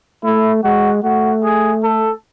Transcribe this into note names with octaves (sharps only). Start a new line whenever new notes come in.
A3 E4
G#3 F#4
A3 F#4
G#4
A4